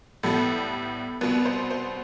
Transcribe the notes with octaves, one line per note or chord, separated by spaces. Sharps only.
A2 G3 B3 A4
C2 B2 B3 B4
C5
C5